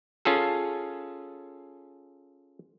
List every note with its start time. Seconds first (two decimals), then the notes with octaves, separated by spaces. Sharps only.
0.25 C#4 F4 G#4 A4